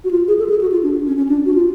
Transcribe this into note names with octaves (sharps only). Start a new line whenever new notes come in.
F#4
F4
G#4
A4
G#4
F#4
F4
D4
C#4
C#4
D4
F#4
F4